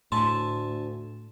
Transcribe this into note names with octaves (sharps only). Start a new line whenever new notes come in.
D2 A2 E5 G#5 A5 C6